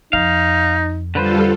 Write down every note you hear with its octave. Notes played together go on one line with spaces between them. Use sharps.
F2 D#4 F5
D3 G3 F4 A4 B4 C5